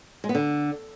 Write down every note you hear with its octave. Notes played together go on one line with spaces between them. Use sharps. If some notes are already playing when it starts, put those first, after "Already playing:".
G#3
B3
D3